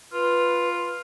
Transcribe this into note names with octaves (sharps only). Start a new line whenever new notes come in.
F4 B4